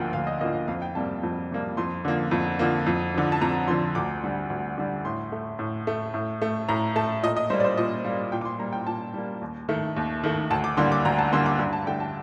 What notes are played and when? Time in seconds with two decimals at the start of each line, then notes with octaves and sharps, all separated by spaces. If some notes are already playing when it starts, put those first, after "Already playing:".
Already playing: D2 D3 F3 A#3 G5
0.13 D2 F5
0.27 D#5
0.41 A#3 D#5
0.43 D3 F3
0.55 F5
0.68 F2 F5
0.82 G5
0.95 C3 G3 A#3 A5
1.23 F2
1.51 C3 G3 A#3
1.77 F2 C6
2.05 D3 F3 A#3
2.31 F2
2.59 D3 F3 A#3
2.86 F2
3.14 D3 F3
3.32 A5
3.41 F2 A#5
3.68 D3 F3 C6
3.95 D2 D6
4.23 D3 G3
4.50 D2
4.78 D3 G3
5.05 A2 C6
5.32 A3
5.59 A2
5.87 A3
6.14 A2
6.42 A3
6.69 A2 A#5
6.96 A3 A5
7.23 A#2 D#5
7.37 D#5
7.50 G3 A#3 C5
7.60 D5
7.64 C5
7.77 A#2 D#5
8.05 G3 A#3 F5
8.32 A#2 G5
8.41 D6
8.45 C6
8.59 G3 A#3 A#5
8.72 G5
8.87 A#2 A5
9.14 G3 A#3
9.42 D#2
9.69 D#3 A3
9.96 D#2
10.23 D#3 A3
10.50 D2 A5
10.64 D6
10.77 D3 G3 A#3 C6
10.92 D6
11.05 D2 A#5
11.18 A5
11.32 D3 G3 A#3 C6
11.46 D6
11.59 G2 C6
11.73 A5
11.87 D3 A3 G5
12.00 A5